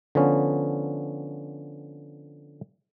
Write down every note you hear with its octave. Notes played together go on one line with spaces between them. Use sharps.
D3 F3 B3 C#4